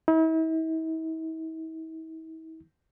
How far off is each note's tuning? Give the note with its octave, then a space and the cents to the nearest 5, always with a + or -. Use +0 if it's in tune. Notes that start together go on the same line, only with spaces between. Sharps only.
E4 -45